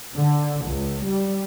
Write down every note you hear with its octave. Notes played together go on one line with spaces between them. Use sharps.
D3
C#2
G3